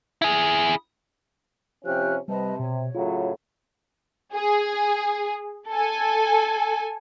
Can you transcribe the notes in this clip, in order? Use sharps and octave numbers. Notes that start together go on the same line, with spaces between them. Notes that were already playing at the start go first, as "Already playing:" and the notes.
E4 G#4
C3 F3 C#4 G4 F6 F#6
C3 G3 B4 D#5 A5
B2 C#5
A2 C#3 F#3 F4
G#4
A4 G#5